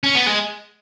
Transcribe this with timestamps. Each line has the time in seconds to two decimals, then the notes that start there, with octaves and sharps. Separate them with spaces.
0.04 C#4
0.15 B3
0.26 G#3